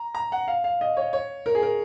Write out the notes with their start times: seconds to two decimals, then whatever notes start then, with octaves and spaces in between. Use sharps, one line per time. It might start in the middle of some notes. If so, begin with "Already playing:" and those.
Already playing: A#5
0.15 A#5
0.32 F#5
0.48 F5
0.64 F5
0.81 D#5
0.97 C#5
1.13 C#5
1.46 A#4
1.55 G#4
1.63 A#4